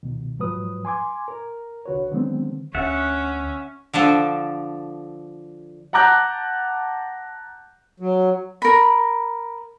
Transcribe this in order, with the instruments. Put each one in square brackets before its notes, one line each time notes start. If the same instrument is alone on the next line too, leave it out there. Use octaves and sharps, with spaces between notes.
[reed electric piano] C#2 B2 D#3
G#2 F3 F#3 B4 D#6
G#5 C6 D6 G#6
A#4
C2 D3 F#4 B4 C#5
D3 D#3 F#3 G#3 B3 C4
[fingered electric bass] D2 [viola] C#4 [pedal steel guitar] E5 F#5
[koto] D3 F3 D4 A4
[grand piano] F#5 A5 A#5 D6 F#6 G6
[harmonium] F#3
[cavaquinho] A#4 B5